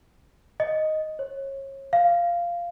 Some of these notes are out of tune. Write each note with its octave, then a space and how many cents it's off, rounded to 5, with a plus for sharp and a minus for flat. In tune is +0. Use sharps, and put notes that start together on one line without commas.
D#5 +0
C#5 -30
F5 -10